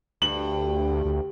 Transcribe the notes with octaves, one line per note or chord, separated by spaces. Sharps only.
D2 G2 F#7
D2